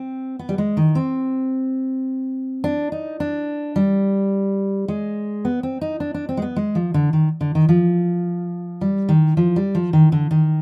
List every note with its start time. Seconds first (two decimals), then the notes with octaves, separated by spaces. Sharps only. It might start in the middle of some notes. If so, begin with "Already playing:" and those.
Already playing: C4
0.39 B3
0.49 G3
0.58 G#3
0.77 D#3
0.95 C4
2.64 D4
2.92 D#4
3.20 D4
3.76 G3
4.88 G#3
5.45 B3
5.63 C4
5.81 D#4
6.00 D4
6.14 D4
6.29 C4
6.37 G#3
6.42 B3
6.56 G#3
6.75 F3
6.94 D3
7.13 D#3
7.41 D3
7.55 D#3
7.69 F3
8.81 G3
9.09 D#3
9.37 F3
9.56 G3
9.75 F3
9.93 D#3
10.12 D3
10.31 D#3